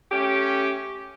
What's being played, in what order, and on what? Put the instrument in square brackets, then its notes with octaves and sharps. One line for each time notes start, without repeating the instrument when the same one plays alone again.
[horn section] A3 C#4 G4